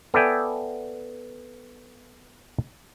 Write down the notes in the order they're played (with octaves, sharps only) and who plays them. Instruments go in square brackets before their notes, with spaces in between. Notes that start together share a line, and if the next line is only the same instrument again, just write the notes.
[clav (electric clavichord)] B3 A4 D5 E5 G5 G#5